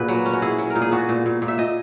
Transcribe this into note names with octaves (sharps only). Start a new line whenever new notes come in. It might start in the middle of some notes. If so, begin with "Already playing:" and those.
Already playing: A#2 F#4 G#4 B4
F#3
C#4
F#4
E4 G#4
F#3
A#4
A#2
G#4
B3 F#4
A#2
A#2
A#2
E5
A#2 D#5